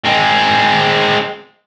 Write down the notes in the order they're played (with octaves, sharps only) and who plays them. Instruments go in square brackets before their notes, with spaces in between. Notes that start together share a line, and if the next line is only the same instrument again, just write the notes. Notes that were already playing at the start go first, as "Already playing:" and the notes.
[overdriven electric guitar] G#3 C4